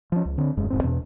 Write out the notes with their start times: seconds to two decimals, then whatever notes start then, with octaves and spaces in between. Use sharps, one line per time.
0.12 F3 C#4
0.25 C#2
0.38 D3 C4
0.57 E1 F#2 G#3
0.70 E1 G#2 C4
0.83 E2 B2